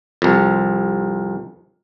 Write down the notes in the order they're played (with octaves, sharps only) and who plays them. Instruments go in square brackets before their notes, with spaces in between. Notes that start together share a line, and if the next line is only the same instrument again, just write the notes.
[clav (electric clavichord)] C2 F2